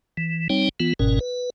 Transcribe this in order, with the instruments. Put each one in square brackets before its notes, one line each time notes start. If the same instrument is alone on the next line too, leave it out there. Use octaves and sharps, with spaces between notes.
[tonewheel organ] E3
G3 C4 D#4 C#5 G5
E3 B3 F4
G1 G#2 B2 C#4 A#4
B4